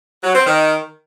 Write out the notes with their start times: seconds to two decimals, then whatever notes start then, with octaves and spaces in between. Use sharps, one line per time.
0.23 F#3
0.34 C4
0.46 D#3